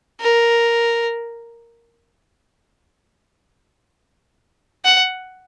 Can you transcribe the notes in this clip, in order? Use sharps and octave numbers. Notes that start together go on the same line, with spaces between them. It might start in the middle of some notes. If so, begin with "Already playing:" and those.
A#4
F#5